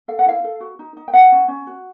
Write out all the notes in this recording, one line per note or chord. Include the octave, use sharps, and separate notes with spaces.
A4 F5
F#5
E4 F5
A4
F#4
D#4
D#4
G5
E4 F#5
C#4
C#4
F#4